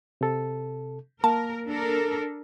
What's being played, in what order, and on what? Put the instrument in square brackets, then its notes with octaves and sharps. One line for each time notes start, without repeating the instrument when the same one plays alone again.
[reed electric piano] C3 A4
[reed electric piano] A#3 [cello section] A#4 [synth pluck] A5
[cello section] D4 A4 A#4